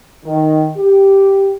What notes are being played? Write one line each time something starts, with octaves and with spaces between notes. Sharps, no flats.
D#3
G4